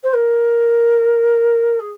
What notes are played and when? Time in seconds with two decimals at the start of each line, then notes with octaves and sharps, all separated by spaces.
0.03 C5
0.13 A#4
1.80 G#4